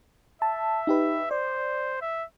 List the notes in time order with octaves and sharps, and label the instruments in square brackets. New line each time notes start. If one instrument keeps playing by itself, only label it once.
[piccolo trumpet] E5 [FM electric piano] A5
[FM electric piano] D#4 G4 B4
[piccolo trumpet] C5 [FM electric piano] D5
[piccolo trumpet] E5